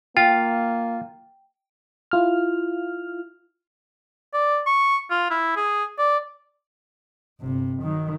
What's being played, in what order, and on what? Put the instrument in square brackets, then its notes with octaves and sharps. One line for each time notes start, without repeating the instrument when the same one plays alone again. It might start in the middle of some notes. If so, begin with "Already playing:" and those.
[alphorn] A#3 [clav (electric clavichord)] F4 [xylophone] G5
[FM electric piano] E4 F4 F6
[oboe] D5
C#6
F4
E4
G#4
D5
[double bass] G1 C3
D#3 F#3